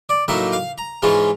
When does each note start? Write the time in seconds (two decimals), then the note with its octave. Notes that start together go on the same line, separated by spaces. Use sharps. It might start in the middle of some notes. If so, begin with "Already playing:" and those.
0.09 D5
0.28 A2 F#3 A#3 D#4 E5
0.52 F5
0.78 A#5
1.02 G#2 E3 G#3 C#4 F4